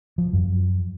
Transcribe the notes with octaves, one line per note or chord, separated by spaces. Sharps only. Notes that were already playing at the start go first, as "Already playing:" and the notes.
F3
F#2